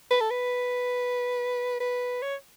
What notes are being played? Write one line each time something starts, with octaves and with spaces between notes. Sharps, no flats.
B4
A4
B4
B4
C#5